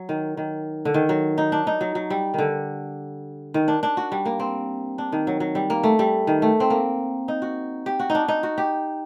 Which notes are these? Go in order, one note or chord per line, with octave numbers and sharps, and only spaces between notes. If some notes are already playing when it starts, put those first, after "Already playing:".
Already playing: F#3
D#3
D#3
D3
D#3
F#3
D#4
D4
D#4
F#3
F#3
G3
D3 D#3
D#3
D4
D4
F#4
G3
A#3
C4
D4
D#3
F#3
F#3
G3
A#3
A3
G3
D#3
A3
C4
A#3
D#4
F#4
G4
F#4
D#4
D4
D#4
F#4
G4